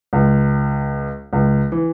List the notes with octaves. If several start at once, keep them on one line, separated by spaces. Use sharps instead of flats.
C#2
C#2
E3